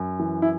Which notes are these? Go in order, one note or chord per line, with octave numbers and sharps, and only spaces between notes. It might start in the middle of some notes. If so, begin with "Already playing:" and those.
Already playing: F#2
E3
E4